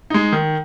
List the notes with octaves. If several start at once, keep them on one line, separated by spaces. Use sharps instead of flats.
G#3 D#4
D#3